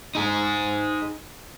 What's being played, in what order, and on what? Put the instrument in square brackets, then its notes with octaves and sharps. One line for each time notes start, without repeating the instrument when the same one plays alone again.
[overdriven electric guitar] D#4 G#4